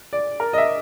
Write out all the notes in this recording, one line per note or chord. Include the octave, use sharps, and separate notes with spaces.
D5
A#4
D#5
E5